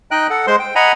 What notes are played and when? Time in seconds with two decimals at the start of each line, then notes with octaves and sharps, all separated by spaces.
0.11 D#4 D#5 G5 F#6
0.30 A4 F#5
0.47 G#3 C5 C6
0.59 G5
0.75 D#5 F#5 G#5 A#5 B5